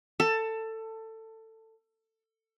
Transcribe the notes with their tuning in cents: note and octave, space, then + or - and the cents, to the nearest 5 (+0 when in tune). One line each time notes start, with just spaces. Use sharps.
A4 +20 A5 +15